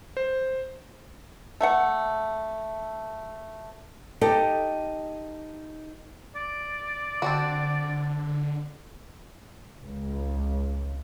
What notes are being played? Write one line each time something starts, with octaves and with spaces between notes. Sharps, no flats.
C5
A3 E5 F#5
D#4 G4 A4 D#5
D5
D3 C4 D4 F#4
C#2